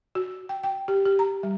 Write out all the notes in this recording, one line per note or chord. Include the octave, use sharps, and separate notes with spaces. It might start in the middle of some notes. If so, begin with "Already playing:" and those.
F#4
G5
G5
G4
G4
A#5
G3